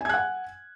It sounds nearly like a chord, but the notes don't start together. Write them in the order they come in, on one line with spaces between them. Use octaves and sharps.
G#5 G#6 F#6 F#5